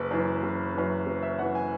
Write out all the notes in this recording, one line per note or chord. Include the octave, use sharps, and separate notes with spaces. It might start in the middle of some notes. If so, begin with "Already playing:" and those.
Already playing: F#1 B4
F#2 E3
F#1
F#2 E3
F#1
E5
F#2 E3 F#5
G#5